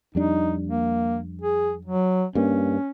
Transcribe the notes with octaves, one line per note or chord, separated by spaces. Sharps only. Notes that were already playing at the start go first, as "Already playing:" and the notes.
F2 G3 D4 D#4
A#3
G#4
F#3
G2 A#3 C#4